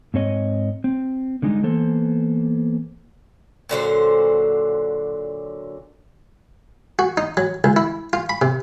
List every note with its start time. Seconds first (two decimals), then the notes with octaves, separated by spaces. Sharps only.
0.14 G#2 C4 C#5 D#5
0.84 C4
1.42 D3 G3 G#3 D#4
1.63 E3 A#3 B3 A4 C5
3.69 A#2 D3 F#3 C5
6.99 F#4
7.17 D#4
7.37 F#3
7.64 C#2
7.76 E4
8.13 F4
8.29 B5
8.42 C3